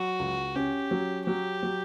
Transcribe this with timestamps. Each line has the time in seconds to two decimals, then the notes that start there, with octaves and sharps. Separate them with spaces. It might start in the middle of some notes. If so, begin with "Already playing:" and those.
Already playing: F#3 F#4
0.19 C#2
0.56 C#4 G4
0.91 F#3
1.27 F#3 G4
1.63 F#3